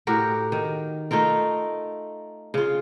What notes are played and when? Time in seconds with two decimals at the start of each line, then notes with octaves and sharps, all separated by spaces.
0.07 A2 F#4 G4 A#4
0.52 D#3
1.11 A3 D#4 F4 A#4
2.54 C#3 F4